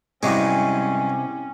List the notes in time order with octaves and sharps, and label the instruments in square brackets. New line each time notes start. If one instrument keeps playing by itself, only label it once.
[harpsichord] G2 F#3 G#3 [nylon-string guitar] C3 [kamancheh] C#4 [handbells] E4 G5 G#5